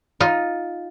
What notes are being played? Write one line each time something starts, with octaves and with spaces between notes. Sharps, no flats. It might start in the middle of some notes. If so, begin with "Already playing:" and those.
D#4 F4